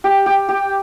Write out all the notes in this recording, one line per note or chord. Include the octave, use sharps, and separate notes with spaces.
G4
G4
G4